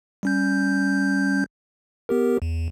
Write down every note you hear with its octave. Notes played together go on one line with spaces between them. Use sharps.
G3 C#4 G6
B3 G4 A#4
E2